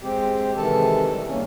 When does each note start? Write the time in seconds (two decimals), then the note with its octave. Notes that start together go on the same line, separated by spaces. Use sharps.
0.02 G#3 C4 G4
0.57 C3 D#3 E3 G#3 A4 A5
1.10 G3
1.28 F#2 D#3 A#3 C#4